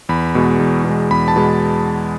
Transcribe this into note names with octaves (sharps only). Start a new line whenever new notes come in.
E2 B5
B2 G#3
E2
B2 G#3
E2 B5
A5
B2 G#3